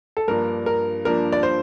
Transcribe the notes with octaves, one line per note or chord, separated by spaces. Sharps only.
A4
G2 F3 A#3 D4 A#4
A#4
G2 F3 A#3 D4 A#4
D5
C5